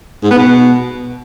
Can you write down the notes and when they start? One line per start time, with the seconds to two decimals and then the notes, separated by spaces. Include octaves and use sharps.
0.23 G#2
0.30 B3
0.38 B2